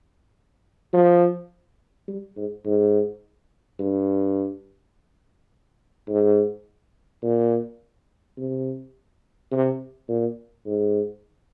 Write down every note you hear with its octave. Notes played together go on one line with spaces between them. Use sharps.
F3
G3
G#2
G#2
G2
G#2
A#2
C3
C3
A#2
G#2